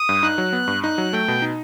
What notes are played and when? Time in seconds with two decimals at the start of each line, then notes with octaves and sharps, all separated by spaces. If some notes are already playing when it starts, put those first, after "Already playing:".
Already playing: D#6
0.09 G2
0.23 D#4 F#6
0.38 F#3
0.53 B3
0.67 G2
0.83 D#4 F#6
0.98 F#3
1.13 A3 G5
1.28 B2
1.42 D#4